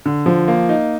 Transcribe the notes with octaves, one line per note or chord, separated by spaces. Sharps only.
D3
F3
A#3
D#4